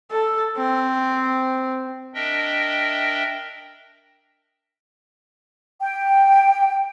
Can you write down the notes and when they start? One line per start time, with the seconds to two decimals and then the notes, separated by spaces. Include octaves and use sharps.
0.11 A4
0.57 C4
2.14 D4 A#4 D#5 E5 G5
5.80 G5